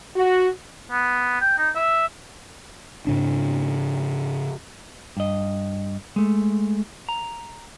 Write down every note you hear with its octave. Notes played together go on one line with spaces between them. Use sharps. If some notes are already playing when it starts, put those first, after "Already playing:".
F#4
B3
G5
D#4
E5
G#2 C#3 D4
G2 D#5
G#3 A3
A#5